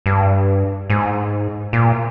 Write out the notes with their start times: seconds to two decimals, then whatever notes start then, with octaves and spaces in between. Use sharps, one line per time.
0.06 G2
0.90 G#2
1.73 A#2